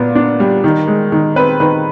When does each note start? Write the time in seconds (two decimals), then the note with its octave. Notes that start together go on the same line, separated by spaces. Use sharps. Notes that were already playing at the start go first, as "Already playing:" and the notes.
Already playing: A#2 B3
0.15 D4
0.40 G3
0.64 D#3
0.88 G#3
1.12 D#3
1.36 C4 B4
1.60 D#3 B4